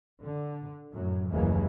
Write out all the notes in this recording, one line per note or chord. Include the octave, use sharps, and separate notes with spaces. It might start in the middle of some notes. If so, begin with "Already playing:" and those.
D3
F#2 A2 F#3
F#1 D#2 E3 F#3 G#3 A#3